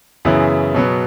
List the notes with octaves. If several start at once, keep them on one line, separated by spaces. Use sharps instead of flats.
F#2 C#3 E3 B3 E4 G#4
B2 F#3 B3